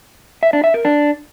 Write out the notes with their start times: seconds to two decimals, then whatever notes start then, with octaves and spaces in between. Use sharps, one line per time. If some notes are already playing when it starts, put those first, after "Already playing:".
0.43 E5
0.53 D4
0.64 E5
0.74 A#4
0.85 D4